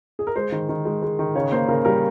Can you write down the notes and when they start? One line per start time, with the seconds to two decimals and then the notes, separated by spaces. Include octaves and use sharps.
0.19 G#4
0.27 A#4
0.36 G#3 C5
0.52 D#3
0.69 D#3
0.85 G#3
1.02 G#3
1.19 D#3
1.35 C#3 C#5
1.52 A#3 C5
1.68 C#3 A#4
1.85 G3 A#4